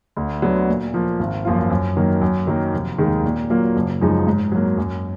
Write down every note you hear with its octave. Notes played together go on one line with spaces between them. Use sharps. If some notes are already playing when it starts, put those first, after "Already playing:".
D2
D3 F#3 B3
A#2
F3 A#3
G#1
F#2 F3 A#3 F4
F#2
D#3 F#3 A#3
F#2
D#3 F#3 A#3
F1
D#2 D#3 G#3
A#2
F#3 A#3 F4
F#1
F#2 F3 G#3 D#4
G#2
F#3 A#3
F#2